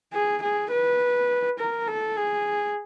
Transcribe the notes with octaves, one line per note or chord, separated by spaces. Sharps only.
G#4
G#4
B4
A#4
A4
G#4